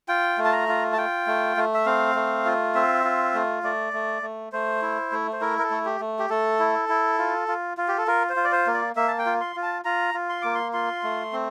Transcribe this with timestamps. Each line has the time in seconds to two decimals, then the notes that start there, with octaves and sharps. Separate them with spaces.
0.08 F4 G5
0.38 A3
0.45 A5
0.53 A#5
0.68 F4
0.93 A5
0.97 F4 G5
1.27 A3
1.57 A3
1.74 E5
1.86 C4 F5
2.15 A3
2.45 F4
2.75 C4 E5
3.04 F4
3.34 A3
3.63 A3 D5
3.93 A3
4.22 A3
4.53 A3 C5
4.82 E4
5.12 A3
5.33 C5
5.41 E4 A#4
5.59 A#4
5.64 A4
5.71 A3
5.85 G4
6.00 A3
6.19 G4
6.30 A3 A4
6.60 E4
6.89 E4
7.18 F4
7.48 F4
7.77 F4
7.88 G4
7.98 A4
8.07 F4 A#4
8.30 C5
8.36 F4
8.44 D5
8.52 C5
8.67 A#3
8.74 D5
8.96 A#3 E5
9.08 A5
9.18 G5
9.26 F4
9.41 C6
9.56 F4
9.63 A5
9.85 F4 A#5
10.14 F4
10.29 C6
10.42 A#3 D6
10.55 C6
10.73 F4 C6
11.04 A3
11.33 C4